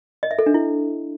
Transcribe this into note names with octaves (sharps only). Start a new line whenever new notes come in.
D#5
E5
A4
D4
E4